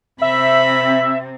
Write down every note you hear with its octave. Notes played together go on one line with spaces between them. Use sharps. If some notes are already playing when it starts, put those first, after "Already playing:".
C3 C4 E5 B5